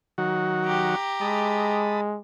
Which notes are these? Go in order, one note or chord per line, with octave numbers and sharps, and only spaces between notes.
D#3 F#3 F#4
G4 A#5
G#3 A5 B5 D#6